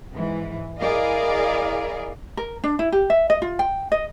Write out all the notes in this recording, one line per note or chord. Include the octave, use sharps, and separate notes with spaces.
G#2 E3
E4 G#4 A#4 D5 D#5 F5
A#4
D4
E4
G4
E5
D#5
F4
G5
D#5